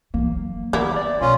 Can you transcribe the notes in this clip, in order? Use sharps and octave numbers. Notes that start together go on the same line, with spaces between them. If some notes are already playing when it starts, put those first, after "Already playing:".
E3 F#3 A#3
D#3 A#3 B3 E4 D6
D5
B2 C#4 F4